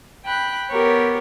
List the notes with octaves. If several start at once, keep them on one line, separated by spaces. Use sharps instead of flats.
G5 B5 F#6
B3 G4 A#4 C#5